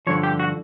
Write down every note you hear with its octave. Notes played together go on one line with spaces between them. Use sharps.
G2 D3 F3 C#5
G4
F#4